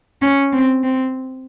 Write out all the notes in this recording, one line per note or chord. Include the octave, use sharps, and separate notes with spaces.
C#4
C4
C4